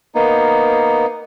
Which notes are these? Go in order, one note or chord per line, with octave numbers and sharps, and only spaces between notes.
A#3 B3 D#4